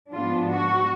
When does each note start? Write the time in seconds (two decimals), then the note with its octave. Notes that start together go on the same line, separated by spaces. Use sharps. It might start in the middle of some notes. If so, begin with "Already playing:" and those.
0.12 G#2 F3 B3 D4 F4
0.50 F#4